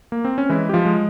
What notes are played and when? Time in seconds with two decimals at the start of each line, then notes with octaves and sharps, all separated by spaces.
0.12 A#3
0.25 C4
0.38 C#4
0.49 E3 G#3 E4
0.69 G4
0.73 F3 F4
0.85 G#3